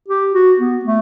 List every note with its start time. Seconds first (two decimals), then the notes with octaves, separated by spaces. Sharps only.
0.08 G4
0.34 F#4
0.59 B3
0.85 A3